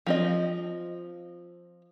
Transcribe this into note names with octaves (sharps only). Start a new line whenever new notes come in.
F3 C4 D#5